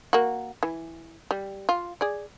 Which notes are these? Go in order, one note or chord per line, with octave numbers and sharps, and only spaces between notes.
A#3 F#4
E3
G3
F4
G#4 D5